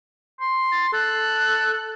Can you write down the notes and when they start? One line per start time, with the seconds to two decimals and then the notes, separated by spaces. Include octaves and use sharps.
0.40 C6
0.72 A6
0.93 A4 F#6